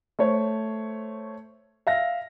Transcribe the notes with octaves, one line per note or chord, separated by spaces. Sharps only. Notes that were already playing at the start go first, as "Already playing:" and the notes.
A3 C5 C#5
E5 F5 A#6